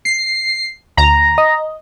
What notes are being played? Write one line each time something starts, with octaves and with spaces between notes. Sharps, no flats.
C7
D2 A#5
D#5